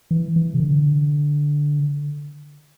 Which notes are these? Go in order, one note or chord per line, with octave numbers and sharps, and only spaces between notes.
E3
E3
C3
D3